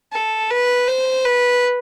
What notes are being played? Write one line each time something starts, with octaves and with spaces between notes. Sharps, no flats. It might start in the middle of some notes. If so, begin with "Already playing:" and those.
A4
B4
C5
B4